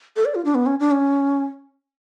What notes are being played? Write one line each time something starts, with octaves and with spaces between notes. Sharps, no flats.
A4
D5
F4
D4
B3
C#4
D4
C#4